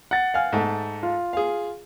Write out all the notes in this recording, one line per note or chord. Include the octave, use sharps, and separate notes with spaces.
F#5 A6
F5 G#5 F6
G#2 A3
F4
G#4 F5